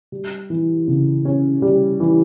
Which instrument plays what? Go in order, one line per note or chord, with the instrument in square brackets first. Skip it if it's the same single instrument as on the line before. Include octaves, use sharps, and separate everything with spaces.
[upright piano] G3
E3
C#3
C#4
G3
E3